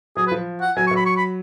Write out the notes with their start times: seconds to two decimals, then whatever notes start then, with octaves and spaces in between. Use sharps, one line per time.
0.17 F#3 G#4
0.27 B4
0.31 F3
0.61 F#5
0.77 F#3 G#5
0.87 C#6
0.91 F#3
0.96 B5
1.06 C#6
1.17 B5